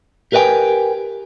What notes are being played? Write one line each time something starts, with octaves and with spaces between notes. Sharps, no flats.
G4 A#4 B4 D#5 G5 G#5